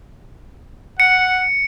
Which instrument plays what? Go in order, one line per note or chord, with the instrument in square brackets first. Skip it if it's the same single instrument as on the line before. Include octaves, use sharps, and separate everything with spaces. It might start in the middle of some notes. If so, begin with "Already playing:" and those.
[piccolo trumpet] F#5 [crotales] C#7